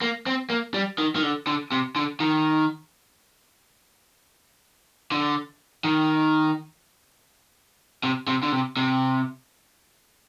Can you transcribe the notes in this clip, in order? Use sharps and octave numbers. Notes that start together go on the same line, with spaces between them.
A#3
C4
A#3
G3
D#3
D#3
D3
D3
C3
D3
D#3
D3
D#3
C3
C3
D3
C3
C3